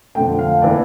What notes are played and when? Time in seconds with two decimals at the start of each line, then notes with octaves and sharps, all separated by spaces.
0.15 F2 D3 A3 G5
0.39 F5
0.62 E3 A#3 D5